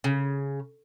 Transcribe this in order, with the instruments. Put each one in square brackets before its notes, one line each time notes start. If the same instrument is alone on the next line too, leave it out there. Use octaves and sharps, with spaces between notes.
[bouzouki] C#3